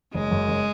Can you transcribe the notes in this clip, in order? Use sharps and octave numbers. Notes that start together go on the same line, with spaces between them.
F#1 G#3
F#2
F#1